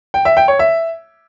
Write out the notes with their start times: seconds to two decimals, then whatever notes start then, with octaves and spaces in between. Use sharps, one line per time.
0.14 G5
0.25 E5
0.37 G5
0.48 C#5
0.59 E5